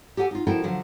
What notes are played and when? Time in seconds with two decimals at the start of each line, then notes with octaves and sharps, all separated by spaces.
0.17 G4 A4 F#5 G#5
0.31 D#4 F4
0.47 F3 E4 F#4 A4 A#4 G5
0.64 D3 F3 F#3